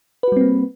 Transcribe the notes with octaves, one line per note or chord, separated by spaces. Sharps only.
G3 A#3 C4 F#4 B4